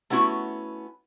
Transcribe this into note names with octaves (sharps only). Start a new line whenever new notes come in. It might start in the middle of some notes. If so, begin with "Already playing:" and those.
A3 B3 C#4 E4 F#4